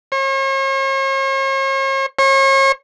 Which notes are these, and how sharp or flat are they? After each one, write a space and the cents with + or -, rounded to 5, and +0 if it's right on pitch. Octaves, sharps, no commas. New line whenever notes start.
C#5 -45
C#5 -40